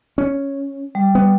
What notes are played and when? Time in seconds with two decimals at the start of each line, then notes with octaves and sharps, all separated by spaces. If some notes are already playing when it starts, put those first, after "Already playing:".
0.18 C#4
0.95 G3
1.15 B3